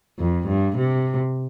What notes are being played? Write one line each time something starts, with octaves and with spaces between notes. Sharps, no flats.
F2
G2
C3